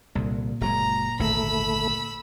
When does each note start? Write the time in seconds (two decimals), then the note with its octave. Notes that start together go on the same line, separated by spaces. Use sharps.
0.15 C2 A#2 D3
0.61 F#1 F#3 G#3 A#5
1.19 G#1 D2 A2 A3 B5 E6